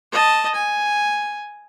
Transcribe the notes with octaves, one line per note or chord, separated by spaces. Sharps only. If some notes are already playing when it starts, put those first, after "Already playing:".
D#5 A5
G#5